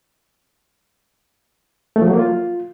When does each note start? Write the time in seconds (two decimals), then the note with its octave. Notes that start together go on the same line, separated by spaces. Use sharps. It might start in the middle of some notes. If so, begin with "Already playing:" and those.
1.96 A3
2.02 F3
2.07 F#3
2.13 A#3
2.19 F4